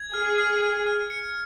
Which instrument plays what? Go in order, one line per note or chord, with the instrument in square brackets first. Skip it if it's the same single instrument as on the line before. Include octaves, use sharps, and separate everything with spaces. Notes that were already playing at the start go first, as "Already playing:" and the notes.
Already playing: [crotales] G#6
[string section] G#4 [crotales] F6
[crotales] F6
F6
F6
C#7